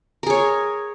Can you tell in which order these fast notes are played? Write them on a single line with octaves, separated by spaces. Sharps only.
A#4 G#4 C#5